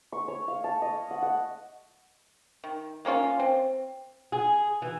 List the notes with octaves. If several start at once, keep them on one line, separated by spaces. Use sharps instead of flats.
C#6
C#5
F5
A5
D#5
F#5
F#5
D#3
G#3 A#3 C#4 F4
C4
G#4
E3